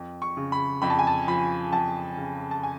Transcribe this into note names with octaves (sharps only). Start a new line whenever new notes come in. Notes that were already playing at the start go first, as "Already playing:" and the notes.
Already playing: F2
C#6
C#3
B5
F2 B5
A5
G#5
A5
F3 B5
F2 A5
C#3
A5
G#5